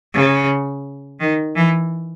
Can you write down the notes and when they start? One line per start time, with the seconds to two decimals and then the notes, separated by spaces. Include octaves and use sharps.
0.14 C#3
1.20 D#3
1.56 E3